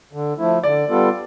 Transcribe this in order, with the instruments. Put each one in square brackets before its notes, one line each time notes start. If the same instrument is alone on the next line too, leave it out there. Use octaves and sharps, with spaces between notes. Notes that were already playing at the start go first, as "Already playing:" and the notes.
[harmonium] D3
F3 A3 E4
[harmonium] D3 [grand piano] D5
[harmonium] G3 B3 F4 A4